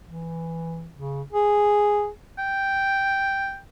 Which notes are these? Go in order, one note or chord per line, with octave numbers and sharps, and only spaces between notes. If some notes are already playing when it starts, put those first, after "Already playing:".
E3
C#3
G#4
G5